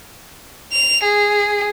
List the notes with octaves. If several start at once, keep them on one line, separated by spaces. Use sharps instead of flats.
F7
G#4